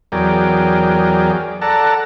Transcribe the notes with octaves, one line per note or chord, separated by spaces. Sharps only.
E2 F#3 G#4 A#4 D5 G5
A4 D5 F#5 A5 A#5